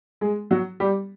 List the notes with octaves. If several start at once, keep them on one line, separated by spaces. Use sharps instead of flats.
G#3 G#4
F#3 F#4
G3 G4